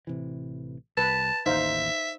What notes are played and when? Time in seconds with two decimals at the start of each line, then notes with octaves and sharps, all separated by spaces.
0.07 A1 C3 E3
0.97 C2 B4 A5
1.46 A1 D#2 D#4 C5 E5 F5